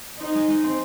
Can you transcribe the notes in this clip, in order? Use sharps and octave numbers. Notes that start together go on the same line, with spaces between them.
C4 D#4
G#3
G#3
C4